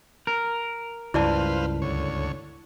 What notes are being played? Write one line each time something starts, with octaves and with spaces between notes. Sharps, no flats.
A#4
C#2 G2 E4 B4 C5 D5 F5 A5
D2 C#5